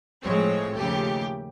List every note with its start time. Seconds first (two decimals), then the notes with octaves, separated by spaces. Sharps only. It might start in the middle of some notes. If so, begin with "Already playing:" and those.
0.22 A2 F3 G#3 C4 C#5
0.75 D#2 C#3 F3 A3 G4